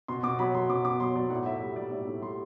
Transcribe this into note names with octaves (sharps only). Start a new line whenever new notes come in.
B2 C6
B2 D6
F#3 B5
F#3 C6
B2 D6
B2 D6
F#3 C6
F#3 D5
A2 F#5
A2 E5
G3
G3 D5
A2 E5
A2
G3 C6